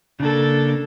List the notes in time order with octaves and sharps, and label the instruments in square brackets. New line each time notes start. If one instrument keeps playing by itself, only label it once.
[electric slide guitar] C#3 A#3 [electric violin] D4 A4